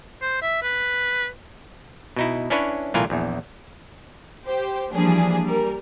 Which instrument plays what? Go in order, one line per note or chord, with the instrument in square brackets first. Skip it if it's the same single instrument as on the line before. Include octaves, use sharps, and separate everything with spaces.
[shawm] C5
E5
B4
[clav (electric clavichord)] B2 D#4 E4
C#4 D4 E4 B4 C#5
B1 A2 E3 F4 A#4 G#5
A#1 E2
[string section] G4 C5
E3 F3 G3 A#3 D4 G#4
G3 A#4